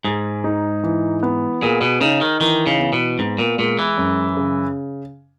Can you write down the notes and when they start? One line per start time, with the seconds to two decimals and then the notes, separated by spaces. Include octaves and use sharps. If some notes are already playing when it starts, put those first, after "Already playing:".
0.04 G#2 G#4
0.44 D#4
0.83 E3
1.23 B3
1.62 A#2 G#4
1.81 B2
2.01 C#3 D#4
2.21 D#3
2.40 D#3 E3
2.67 C#3
2.80 B3
2.93 B2
3.19 G#2 B3
3.38 A#2
3.58 A#2 G#3
3.79 E3
3.98 F#2
4.37 C#3